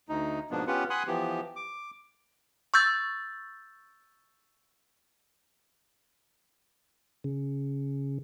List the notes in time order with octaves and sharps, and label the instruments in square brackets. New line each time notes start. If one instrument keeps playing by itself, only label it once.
[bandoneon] D2 D#4
G#2 B2 F3 A#3 B3 D4
B3 C#4 F4 G4 B4 F#5
F#5 G#5 B5 C6 D#6 F#6
E3 F3 B3 G4
D6
[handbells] C#6 E6 G6 A6
[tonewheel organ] C#3